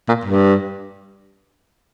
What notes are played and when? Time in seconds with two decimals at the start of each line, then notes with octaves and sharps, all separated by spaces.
0.09 A#2
0.25 G2